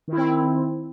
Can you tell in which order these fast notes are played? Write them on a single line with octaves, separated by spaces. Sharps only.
D#3 E4 C4